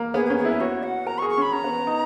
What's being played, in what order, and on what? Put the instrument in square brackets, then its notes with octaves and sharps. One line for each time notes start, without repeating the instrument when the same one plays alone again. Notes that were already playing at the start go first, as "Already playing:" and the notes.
Already playing: [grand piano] A#3
[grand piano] B3 [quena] G#4
[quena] G#4
[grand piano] C#4
[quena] G#4
[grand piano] E4
[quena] B4
[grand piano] F#4 [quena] C#5
[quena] F#5
[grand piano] A#4 [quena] A#5
[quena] C#6
[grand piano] G#4
[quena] C#6
[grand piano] C#4
[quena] B5
[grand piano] C#4 [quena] A#5
[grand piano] B3
D#4